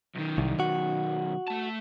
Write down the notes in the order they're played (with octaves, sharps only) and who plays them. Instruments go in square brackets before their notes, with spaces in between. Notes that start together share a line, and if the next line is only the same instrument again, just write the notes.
[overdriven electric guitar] B1 D#3
[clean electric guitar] C2
F#4
[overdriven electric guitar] A3 A5